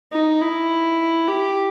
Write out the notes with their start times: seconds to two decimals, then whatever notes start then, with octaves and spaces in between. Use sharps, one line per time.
0.12 D#4
0.41 E4
1.27 G4